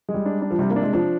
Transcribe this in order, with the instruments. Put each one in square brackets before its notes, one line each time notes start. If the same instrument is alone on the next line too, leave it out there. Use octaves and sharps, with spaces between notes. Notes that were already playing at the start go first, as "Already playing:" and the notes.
[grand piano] G#3
[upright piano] G3
[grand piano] D4
D4
[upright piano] F3
[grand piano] C3 [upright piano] G3
[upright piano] A#3
[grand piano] D4
[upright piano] G#3
[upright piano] F3 [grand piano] D4